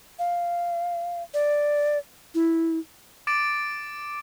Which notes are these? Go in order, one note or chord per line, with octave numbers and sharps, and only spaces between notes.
F5
D5
E4
D6 A6 D7